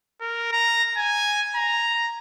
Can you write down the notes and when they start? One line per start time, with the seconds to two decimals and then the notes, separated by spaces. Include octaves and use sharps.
0.21 A#4
0.52 A#5
0.97 G#5
1.56 A#5